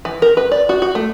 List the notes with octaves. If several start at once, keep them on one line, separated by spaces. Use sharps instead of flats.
E3
A#4
B4
D5
F#4
F#4
A3